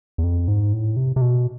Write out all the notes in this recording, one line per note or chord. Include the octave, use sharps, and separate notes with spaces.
E2
F2
G#2
A2
C3
C3
B2